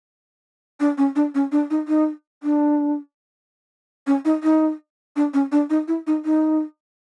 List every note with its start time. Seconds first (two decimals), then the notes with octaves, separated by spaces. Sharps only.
0.80 D4
0.98 C#4
1.16 D4
1.35 C#4
1.52 D4
1.70 D#4
1.88 D#4
2.43 D4
4.07 C#4
4.25 D#4
4.44 D#4
5.16 D4
5.34 C#4
5.52 D4
5.70 D#4
5.88 E4
6.07 D#4
6.25 D#4